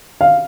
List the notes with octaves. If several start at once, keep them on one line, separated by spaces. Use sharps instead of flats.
F5